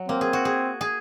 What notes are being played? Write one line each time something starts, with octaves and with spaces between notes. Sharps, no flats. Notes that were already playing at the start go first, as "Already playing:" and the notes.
Already playing: F#3
A#3 C4
G#4
F#4
G#4
G#4